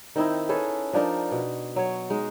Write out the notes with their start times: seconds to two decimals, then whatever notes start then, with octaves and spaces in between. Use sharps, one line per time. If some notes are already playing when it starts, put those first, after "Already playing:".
0.16 D#3 C4 D#4 E4
0.49 C#4 G#4 A4 B4
0.93 F3 D4 D#4 A#4
1.32 B2
1.76 F#3 C#5
2.10 G#3 D#4